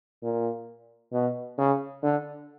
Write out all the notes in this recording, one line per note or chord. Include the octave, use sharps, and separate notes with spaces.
A#2
B2
C#3
D3